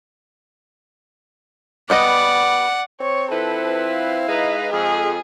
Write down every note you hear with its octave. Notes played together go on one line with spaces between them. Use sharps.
G3 B3 D5 D#5 F#5
C4 C#5
F3 E4 A4 B4
F5
G#3 D#4 B4
F2 G#4